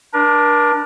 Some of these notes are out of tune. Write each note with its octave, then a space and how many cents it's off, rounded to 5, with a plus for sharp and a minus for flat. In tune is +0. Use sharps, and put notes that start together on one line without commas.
D4 +5 A#4 +40